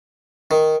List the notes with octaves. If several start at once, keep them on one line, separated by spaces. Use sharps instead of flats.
D#3